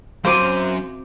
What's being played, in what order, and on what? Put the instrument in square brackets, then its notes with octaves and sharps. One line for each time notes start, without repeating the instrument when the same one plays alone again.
[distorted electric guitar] F#2 [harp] C4 D6 D#7 [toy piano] E4 F#4 F5 [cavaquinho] C5